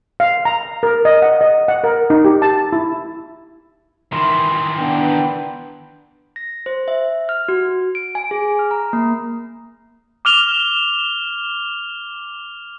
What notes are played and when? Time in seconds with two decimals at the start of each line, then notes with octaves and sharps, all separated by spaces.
0.20 F5
0.45 A#5
0.83 A#4
1.05 D#5
1.22 F#5
1.41 D#5
1.68 F#5
1.84 A#4
2.10 D#4
2.25 G4
2.42 A5
2.73 E4
4.12 D#3 E3 C6
4.78 B3 D4 G5
6.36 A#6
6.66 C5
6.88 E5
7.29 F6
7.48 F#4
7.95 D7
8.15 G#5
8.31 G#4
8.59 F6
8.71 A#5
8.93 A#3
10.25 D6 F6 F7 G7